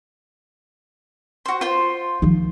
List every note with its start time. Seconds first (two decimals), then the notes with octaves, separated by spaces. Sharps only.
1.46 F#4 C5
1.61 F4 C5
2.22 D#3 F3